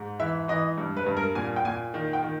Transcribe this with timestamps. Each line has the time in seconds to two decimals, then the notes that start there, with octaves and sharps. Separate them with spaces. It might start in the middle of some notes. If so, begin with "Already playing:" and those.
Already playing: G#2
0.20 E3 E5
0.48 E3 D#5
0.78 G2
0.97 B4
1.06 G2
1.17 A#4
1.35 A#2 G#5
1.56 G5
1.65 A#2 G#5
1.94 D#3
2.13 G5
2.23 D#3